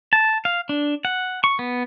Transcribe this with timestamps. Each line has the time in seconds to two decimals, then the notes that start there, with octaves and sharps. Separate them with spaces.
0.13 A5
0.45 F5
0.69 D4
1.05 F#5
1.44 C#6
1.59 B3